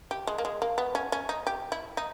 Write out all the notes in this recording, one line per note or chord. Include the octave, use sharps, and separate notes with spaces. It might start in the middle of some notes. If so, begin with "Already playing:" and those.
G4
G#3
A#3
G#3
A#3
B3
C#4
C#4
D#4
G4
E4
D#4